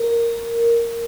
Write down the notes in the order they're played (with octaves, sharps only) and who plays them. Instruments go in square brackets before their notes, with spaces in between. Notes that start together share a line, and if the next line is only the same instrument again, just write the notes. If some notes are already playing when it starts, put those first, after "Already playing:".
Already playing: [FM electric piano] A#4